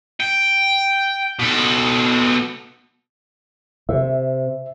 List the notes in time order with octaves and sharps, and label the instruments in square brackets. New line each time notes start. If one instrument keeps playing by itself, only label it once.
[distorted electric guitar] G5
B2 A4
[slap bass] C3 [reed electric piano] E5